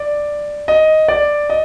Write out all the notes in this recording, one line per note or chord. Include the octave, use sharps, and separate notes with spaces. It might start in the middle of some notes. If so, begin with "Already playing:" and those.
Already playing: D5
D#5
D5
D#5